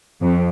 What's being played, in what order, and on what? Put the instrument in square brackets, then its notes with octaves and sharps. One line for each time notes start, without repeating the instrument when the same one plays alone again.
[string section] F2